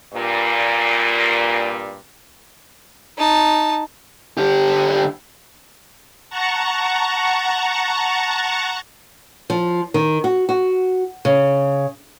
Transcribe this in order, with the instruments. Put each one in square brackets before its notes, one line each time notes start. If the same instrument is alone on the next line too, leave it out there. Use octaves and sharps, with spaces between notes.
[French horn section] G2 A#2
[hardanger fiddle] D#4 A5
[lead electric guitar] D3 G4
[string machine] F#5 A5 A#5 C#6
[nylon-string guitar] F3
D#3
F#4
F#4
C#3